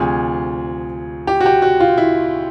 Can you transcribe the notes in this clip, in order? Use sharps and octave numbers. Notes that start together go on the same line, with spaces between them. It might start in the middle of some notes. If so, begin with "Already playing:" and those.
Already playing: D2 C3 F3 G#4
G4
F#4
G4
F#4
F4
E4